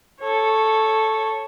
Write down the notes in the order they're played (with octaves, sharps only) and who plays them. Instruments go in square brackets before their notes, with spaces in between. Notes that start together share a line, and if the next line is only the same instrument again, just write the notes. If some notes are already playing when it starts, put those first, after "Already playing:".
[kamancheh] A4 C#5